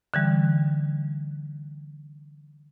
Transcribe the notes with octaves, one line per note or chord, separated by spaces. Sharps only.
D3 E3 G3